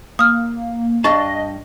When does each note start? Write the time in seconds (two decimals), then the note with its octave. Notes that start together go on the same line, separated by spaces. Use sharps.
0.19 A#3 D#6 F6
1.04 G2 D4 D#5 A5 C#6 A6